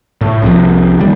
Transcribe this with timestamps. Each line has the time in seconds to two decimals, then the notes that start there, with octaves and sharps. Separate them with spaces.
0.21 A2
0.42 C2 C3 D#3 F3
1.00 D#3 G3